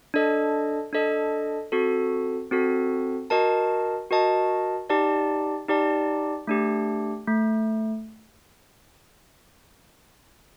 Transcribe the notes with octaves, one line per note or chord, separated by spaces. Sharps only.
D4 A4 D#5
D4 A4 D#5
C4 F#4 A4
C4 F#4 A4
F#4 A#4 D#5 A5
F#4 A#4 D#5 A5
D#4 G4 D5 A5
D#4 G4 D5 A5
A3 D4 G4
A3